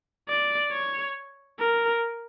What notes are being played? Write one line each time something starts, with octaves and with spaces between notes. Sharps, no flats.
D5
C#5
A#4